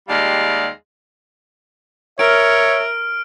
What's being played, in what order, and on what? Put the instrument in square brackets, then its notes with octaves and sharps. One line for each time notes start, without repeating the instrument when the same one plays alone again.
[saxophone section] D#2 G3 G#3 F4 D5 F5
[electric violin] A#4 [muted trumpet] C#5 [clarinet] E5 [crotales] F6 D7